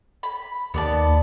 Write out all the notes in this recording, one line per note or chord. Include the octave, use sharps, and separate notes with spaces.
B5
D#2 B3 D5 A5